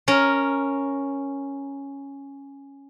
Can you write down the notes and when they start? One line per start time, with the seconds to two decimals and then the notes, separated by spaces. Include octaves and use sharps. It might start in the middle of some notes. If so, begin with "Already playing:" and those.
0.08 C#4 A#4